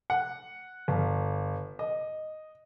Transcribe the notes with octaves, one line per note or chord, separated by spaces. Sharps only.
F#5
G1
D#5